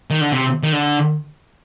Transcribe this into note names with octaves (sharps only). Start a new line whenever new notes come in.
D#3
D3
C3
D#3
D3